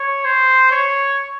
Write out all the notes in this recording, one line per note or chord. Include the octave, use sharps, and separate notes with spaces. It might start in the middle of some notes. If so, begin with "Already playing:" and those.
Already playing: C#5
C5
C#5